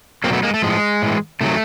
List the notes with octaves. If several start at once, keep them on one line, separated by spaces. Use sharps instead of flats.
B2 F#3 A#3 C4
A3 B3
G#3 A#3
A3
A2 F3 G#3
A2 E3
C3 D#3 F#3 A3